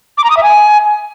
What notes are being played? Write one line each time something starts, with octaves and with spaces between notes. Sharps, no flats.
D6
A#5
D#6
E5
G#5